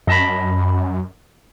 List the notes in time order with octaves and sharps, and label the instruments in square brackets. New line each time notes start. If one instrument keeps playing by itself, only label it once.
[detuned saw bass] F#2 [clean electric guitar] D#5 A5 B5